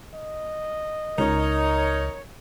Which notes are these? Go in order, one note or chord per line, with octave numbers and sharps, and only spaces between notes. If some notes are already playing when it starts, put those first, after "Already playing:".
D#5
C#2 D#4 A#4 C#5